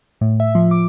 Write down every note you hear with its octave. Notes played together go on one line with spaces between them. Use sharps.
A2
E5
F3
D6